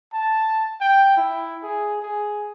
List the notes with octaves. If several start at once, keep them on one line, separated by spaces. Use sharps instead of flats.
A5
G5
E4
G#4
G#4